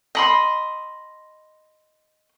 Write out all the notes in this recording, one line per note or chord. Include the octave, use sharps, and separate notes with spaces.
D#5 B5 C6